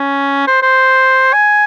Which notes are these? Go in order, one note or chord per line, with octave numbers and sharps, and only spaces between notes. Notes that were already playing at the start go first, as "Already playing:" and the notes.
Already playing: C#4
C5
C5
G#5